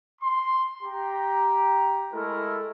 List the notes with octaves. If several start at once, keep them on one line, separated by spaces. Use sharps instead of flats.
C6
G4 G5 A#5
G#3 A3 E4 A4 A#4